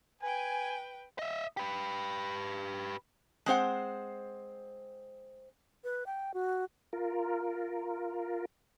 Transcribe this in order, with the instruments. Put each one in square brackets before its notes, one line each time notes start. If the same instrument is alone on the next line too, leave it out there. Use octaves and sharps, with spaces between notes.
[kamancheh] B4 G5 [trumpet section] G#5
[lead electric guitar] D#5 E5
G4 B4
[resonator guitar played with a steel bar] G#3 C4 C5 F#5
[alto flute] B4
G5
F#4
[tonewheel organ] F4 A#4